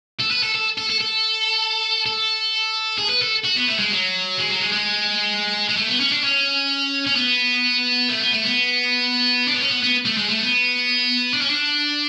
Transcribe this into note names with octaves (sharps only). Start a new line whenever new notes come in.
A4
B4
A4
A4
A4
A4
A4
A4
G#4
B4
A4
F#4
B3
A3
G#3
F#3
G#3
F#3
G#3
G#3
G#3
A3
B3
C#4
D4
C#4
C#4
B3
A3
B3
A3
B3
D4
B3
C#4
B3
B3
A3
G#3
A3
B3
D4
C#4
D4